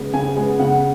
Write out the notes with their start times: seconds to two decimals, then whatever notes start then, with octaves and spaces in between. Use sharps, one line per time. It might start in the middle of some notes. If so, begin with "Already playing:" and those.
Already playing: C#3 G#3 B3
0.14 C#3 G#5
0.36 G#3 B3
0.59 C#3 F#5